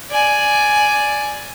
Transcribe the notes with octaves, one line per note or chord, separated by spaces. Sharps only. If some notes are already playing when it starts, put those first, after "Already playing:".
D5 G#5